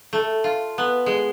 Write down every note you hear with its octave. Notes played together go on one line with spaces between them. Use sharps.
A3
F4
B3
G#3